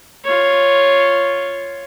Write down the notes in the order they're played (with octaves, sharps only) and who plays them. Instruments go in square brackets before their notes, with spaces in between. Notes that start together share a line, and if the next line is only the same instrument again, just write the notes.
[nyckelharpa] F4 C#5